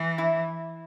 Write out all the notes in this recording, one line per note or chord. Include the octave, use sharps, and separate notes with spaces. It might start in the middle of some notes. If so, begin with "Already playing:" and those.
Already playing: E3
E4